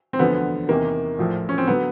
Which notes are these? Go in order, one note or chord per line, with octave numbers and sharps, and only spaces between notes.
C4
E1 D2 D3 F3 B3
E2 C3 D#3 A#3
A#1 A2 F3
C#4
C4
D3 F#3 B3